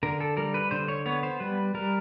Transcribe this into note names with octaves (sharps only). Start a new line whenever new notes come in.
D3 A#4
A4
G3 A#4
B4
D3 C5
C#5
B3 C#5
C5
G3 B4
G3 A#4